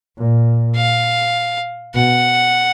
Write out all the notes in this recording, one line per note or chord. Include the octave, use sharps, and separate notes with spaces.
A#2
F5
B2 F#5